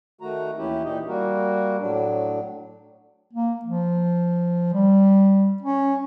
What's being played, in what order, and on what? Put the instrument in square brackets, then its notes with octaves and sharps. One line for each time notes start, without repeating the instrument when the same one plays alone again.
[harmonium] D#3 A3 F#4 A#5
D#2 E3 C#4 E4 G4
A#2 E3 D#4 G4 D#5
G3 A#3 F#4 A#4
A2 F#3 D4
[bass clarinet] A#3
F3
G3
C#4